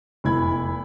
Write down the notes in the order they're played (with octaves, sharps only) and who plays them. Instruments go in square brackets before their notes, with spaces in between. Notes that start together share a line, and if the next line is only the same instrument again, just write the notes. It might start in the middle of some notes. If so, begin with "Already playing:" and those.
[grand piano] F1 E2 E4 B5 G#6